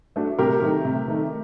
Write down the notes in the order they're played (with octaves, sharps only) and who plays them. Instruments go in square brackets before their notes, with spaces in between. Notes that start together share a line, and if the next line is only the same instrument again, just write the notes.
[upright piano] A3 D4 F#4
[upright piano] C3 [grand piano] G4 A#4
[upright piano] D#3 A3
C3
D#3 A3